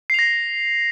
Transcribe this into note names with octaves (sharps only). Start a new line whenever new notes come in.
A#6 C7 F7